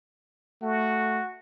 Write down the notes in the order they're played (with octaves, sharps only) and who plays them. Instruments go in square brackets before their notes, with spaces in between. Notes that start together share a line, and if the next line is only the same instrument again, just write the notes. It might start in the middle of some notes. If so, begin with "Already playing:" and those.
[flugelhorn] A3 [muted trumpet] F#4